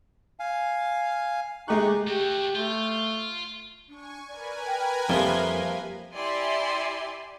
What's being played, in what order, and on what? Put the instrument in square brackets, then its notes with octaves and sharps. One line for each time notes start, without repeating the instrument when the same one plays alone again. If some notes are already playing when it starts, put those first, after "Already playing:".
[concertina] F5 G#5
[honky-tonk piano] G#3 A3 F#6 [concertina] D#4 G4 C#6
[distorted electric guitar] A3 F#4 [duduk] G4
[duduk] A3 [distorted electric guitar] F4
[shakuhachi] D4 [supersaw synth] G#5 C#6
[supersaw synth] A#4 B4 G#5 [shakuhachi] D5
[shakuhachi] G5
[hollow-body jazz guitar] F2 [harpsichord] F3 G3 A#3 [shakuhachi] E5
[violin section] E4 G4 D5 E5 G#5 C6